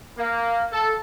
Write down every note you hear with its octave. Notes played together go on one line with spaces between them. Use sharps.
A#3
A4